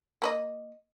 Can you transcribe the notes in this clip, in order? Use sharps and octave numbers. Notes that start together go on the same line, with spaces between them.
A#3 B4 D#5